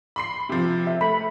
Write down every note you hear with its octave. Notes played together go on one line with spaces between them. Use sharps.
B5 C6 C7
C3 F3
E5
A3 B5